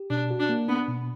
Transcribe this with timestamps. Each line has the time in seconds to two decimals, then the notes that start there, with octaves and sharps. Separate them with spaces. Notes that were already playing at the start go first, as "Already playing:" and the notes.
Already playing: G4
0.10 B2 D4
0.31 F#4
0.40 D4
0.49 A#3
0.68 B3 D4
0.88 B2